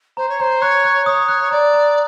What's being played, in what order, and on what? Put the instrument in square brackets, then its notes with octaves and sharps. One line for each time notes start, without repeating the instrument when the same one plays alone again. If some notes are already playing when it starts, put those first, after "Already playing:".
[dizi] C5 [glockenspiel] A#5
[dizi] C#5
[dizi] C5 [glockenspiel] A#5
[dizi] C#5 [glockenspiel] F#6
[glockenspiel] F#6
[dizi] C#5 [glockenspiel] D#6
[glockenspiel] F#6
[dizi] D5 [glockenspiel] A#5
[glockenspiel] A#5